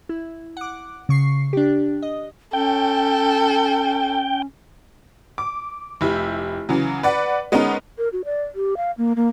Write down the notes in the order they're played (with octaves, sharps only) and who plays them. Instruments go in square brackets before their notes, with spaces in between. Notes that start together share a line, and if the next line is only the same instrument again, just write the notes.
[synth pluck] E4
F#5 D6
C#3 C#6 C7
D4 G4
D#5
[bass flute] C#4 [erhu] A4 [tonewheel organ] G5
[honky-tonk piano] D6
F1 E4 G4
C#3 E3 F#3
B4 D5 F#5
G#3 B3 C#4 D#4 A#4
[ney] A#4
F#4
D5
G4
F5
A#3
A#3